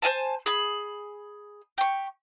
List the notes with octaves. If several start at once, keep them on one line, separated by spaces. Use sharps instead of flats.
C5 D5 G#5 A5
G#4 B5
G4 C#6